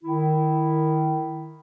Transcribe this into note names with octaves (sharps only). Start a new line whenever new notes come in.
D#3 E4